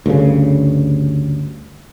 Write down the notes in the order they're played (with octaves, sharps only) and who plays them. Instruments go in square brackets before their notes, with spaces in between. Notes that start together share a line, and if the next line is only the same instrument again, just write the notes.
[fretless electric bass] D2 G2 C#3